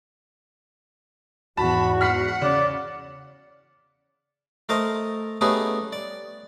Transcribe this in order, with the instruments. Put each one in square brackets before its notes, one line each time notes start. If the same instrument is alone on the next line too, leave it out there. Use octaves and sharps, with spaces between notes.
[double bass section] E2 G#2 [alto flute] F#4 [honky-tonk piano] A5 [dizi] B5
[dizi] F#5 [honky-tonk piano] F6 B6 C7
[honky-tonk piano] C#3 [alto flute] D5
[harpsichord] A3 A#4 C5 D#5 A5
A3 B3 C#4 D#4 G4 G#4
D5